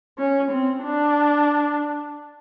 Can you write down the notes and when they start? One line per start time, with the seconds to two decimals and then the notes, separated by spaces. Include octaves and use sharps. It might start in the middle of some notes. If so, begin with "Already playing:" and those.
0.18 C#4
0.51 C4
0.83 D4